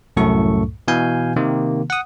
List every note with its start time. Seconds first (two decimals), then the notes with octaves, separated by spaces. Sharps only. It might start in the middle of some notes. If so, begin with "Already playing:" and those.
0.17 C2 F#2 A2 A3 A4 C#6
0.88 B2 E3 F5 G#5 G6
1.36 C3 D#3 A#3
1.90 F#5 D#6